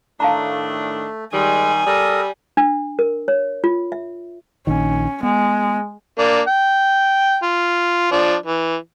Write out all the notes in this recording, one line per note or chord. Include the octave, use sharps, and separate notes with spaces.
A2 D#3 A3 D4 F5 A5 A#5
D#3 G3 G#3 G#5
G3 A4 A#4 D#6
D4
A#4
C#5
F4
E5
A#1 D#3 C#4
G#3 B3
A#3 D4
G5
F4
F3 D4
E3